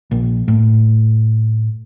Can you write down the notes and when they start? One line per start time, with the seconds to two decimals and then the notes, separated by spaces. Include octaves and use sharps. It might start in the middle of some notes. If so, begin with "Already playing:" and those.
0.11 A#1
0.48 A2